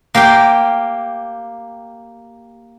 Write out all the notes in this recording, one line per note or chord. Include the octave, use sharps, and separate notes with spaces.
A#3 G4 F5 G5